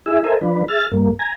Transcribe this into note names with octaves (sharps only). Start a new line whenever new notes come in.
E4 G#4 E5
A4 A#4 C5 D#5 E5 G#5
F3 D4 B4
G#4 E5 F6 A6
G2 A#3
G#5 A#5